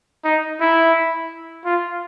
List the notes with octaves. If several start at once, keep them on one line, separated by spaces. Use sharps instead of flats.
D#4
E4
F4